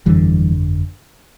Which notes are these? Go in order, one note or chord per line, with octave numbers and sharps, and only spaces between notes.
G1 F2 D3 E3 G3